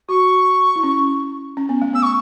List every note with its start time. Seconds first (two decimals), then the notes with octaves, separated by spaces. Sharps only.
0.09 F#4 C#6
0.76 E4
0.83 C#4
1.57 C#4
1.69 B3
1.82 A3
1.94 B3 E6
2.03 C#6